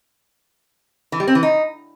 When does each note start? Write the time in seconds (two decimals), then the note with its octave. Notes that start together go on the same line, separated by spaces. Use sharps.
1.12 E3
1.20 G3
1.28 C4
1.35 E3
1.43 D#4